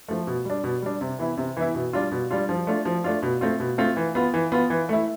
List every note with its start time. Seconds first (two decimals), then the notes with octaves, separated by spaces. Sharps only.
0.08 F3 A3
0.27 B2
0.45 G3 D4
0.64 B2
0.82 G3 D4
1.01 C3
1.19 E3 B3 E4
1.37 C3
1.57 E3 B3 E4
1.75 B2
1.93 G3 D4 F4
2.12 B2
2.31 G3 D4 F4
2.49 F3
2.67 A3 D4 F4
2.85 F3
3.04 A3 D4 F4
3.22 B2
3.41 A3 C4 F4
3.60 B2
3.78 A3 C4 F4
3.97 E3
4.15 B3 F4
4.34 E3
4.52 B3 F4
4.70 E3
4.89 A3 E4